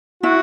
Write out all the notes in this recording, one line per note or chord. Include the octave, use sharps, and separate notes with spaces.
E4 F#4